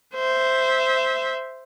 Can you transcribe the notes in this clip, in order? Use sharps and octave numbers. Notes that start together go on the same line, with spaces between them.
C5 E5